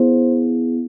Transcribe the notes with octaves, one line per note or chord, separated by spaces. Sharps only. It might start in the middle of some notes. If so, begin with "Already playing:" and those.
Already playing: B3 E4 G#4 C5